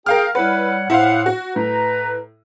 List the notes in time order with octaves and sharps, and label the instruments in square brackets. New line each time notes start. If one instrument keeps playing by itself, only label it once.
[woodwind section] G#4 G5 [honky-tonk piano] A#4 F5 F6
[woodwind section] G3 C#5 F#5 [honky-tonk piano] E4 B4
[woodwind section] A2 F#5 [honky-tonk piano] E4 C5 F5
[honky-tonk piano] F#4
[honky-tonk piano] A2 [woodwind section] B4 A#5